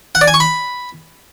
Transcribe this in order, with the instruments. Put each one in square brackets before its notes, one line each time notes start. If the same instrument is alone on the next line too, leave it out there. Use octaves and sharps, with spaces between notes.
[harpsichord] F#5
D5
G#5
C#6
B5